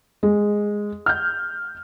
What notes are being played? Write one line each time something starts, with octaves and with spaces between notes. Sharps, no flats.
G#3
F6 G6